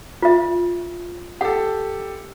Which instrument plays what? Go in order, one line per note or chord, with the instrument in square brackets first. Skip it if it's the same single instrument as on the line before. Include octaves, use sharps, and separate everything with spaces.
[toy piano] F4 E5
[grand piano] G4 A4 [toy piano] F#5